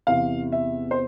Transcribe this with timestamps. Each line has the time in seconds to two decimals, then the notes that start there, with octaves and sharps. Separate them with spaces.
0.07 E2 C3 E3 F5
0.52 E5
0.91 C5